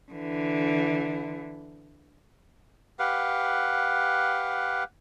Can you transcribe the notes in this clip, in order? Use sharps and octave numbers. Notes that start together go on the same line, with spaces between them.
D3 E3
G4 B4 F5 F#5